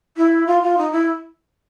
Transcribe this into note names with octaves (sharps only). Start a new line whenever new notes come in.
E4
F4
F4
D#4
E4